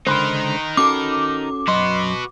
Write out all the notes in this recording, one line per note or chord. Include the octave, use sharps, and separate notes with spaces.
C#2 D3 D#4 A#4 C5 B5 C6 F#6
C#4 F#4 A4 D6
F#2 F#4 B4 D#5 C6